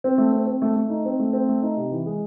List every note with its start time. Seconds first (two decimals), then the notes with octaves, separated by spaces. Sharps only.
0.04 C4
0.18 A3
0.32 C4
0.47 C4
0.62 A3
0.76 A3
0.90 D#4
1.05 C4
1.19 A3
1.33 C4
1.49 A3
1.62 D#4
1.76 C3
1.91 E3
2.06 G#3